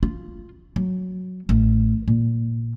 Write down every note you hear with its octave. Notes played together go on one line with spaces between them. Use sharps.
F4
F#3
A1
A#2